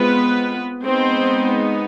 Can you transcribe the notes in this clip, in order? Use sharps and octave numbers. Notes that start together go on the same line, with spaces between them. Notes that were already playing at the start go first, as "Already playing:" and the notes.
Already playing: G#3 B3 C4 F4 B4
G#3 B3 C4 D#4 C5